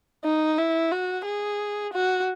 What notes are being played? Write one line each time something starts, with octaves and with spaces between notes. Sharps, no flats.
D#4
E4
F#4
G#4
F#4